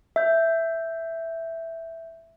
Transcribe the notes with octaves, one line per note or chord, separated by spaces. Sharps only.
E5 G6